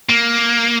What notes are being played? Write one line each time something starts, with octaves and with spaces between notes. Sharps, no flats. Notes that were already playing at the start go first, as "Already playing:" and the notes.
A#3